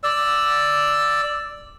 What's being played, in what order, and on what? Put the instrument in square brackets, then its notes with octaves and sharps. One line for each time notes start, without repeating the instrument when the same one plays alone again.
[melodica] D5 E6